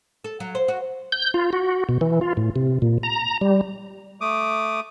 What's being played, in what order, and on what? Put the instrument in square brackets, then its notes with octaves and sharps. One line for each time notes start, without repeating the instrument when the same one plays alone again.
[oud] A4
F#3
C5
F#4
[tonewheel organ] G6
F4
F#4
B2
E3
F4
A2
C3
A#2
A#5
G3
[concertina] A3 D6 D#6